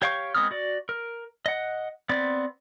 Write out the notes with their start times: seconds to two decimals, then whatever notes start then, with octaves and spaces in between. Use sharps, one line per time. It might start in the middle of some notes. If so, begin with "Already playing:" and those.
0.02 G4 C#5 F5 G5 C#6
0.35 G#3 B3 C4 D#6 F6
0.51 F#4 D5
0.89 A#4
1.46 D#5 F#5
2.09 B3 C4 D5